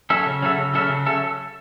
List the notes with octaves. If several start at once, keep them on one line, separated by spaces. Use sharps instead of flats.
F#3 C#4 A4 E5
C#3
F#3 C#4 A4 E5
C#3
F#3 C#4 A4 E5
C#3
F#3 C#4 A4 E5